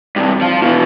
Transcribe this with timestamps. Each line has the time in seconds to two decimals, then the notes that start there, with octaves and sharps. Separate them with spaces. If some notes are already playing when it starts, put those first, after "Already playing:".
0.16 G2 C3
0.41 F3
0.62 B2 E3